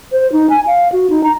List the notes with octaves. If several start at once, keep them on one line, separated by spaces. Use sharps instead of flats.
C5
D#4
G#5
F5
F#4
D#4
A#5